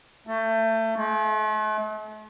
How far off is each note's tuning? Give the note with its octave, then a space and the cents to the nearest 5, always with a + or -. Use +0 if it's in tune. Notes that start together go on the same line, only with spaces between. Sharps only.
A3 +25
A3 -45